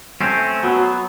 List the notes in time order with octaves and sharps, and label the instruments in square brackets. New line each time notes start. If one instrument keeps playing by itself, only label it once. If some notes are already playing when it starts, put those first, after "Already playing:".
[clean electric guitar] A3 C4 C#4
[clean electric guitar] F#3 B3 [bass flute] F#4